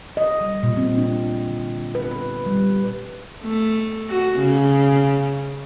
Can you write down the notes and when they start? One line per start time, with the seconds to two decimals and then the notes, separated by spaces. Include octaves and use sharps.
0.17 D#5
0.41 G3
0.63 A#2
0.77 C4
0.98 D4
1.47 D3
1.95 B4
2.11 B4
2.46 G3
3.43 A3
4.09 F#4
4.39 C#3